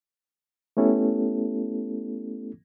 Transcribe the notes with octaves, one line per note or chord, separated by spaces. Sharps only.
A3 B3 C#4 E4 G4 A4